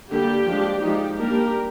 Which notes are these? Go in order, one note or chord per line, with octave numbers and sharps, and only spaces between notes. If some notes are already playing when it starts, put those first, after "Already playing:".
D3 G3 A#3 G4
F3 G#3 D4
F3 G#3 D#4 G4
G3 A#3 D4 G4 A#4